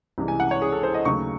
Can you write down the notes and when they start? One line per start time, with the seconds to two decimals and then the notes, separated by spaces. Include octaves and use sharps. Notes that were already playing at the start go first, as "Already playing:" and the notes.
0.18 C2 C3 E3 G#3
0.28 G#5
0.40 F#5
0.51 C#5
0.62 G#4
0.72 A4
0.83 C5
0.94 D#5
1.05 D#2 C#3 F#3 A3 C#6